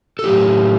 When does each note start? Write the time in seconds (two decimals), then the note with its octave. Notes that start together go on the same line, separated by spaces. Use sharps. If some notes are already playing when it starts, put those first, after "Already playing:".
0.19 A4
0.24 A2 F#3 A3 G4